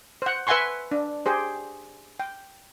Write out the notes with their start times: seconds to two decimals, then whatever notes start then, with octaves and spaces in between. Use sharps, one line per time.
0.22 C5 F#5
0.47 B4 E5 F#5 G#5 C6 C#6
0.91 D4
1.26 G4 G#4 C5
2.20 G5